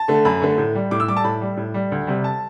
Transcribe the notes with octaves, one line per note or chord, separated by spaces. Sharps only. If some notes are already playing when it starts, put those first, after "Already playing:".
Already playing: A5
D3 A3
F#2 B5
D3 A3
A2
G3
A2 D6
E6
G3 D6
A5
A2 B5
G3
A2
G3
D2
C3 G3
A5